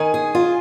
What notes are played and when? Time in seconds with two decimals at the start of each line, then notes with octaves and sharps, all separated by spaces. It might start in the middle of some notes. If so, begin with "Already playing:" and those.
Already playing: D#3 G#5
0.14 G#4
0.35 F4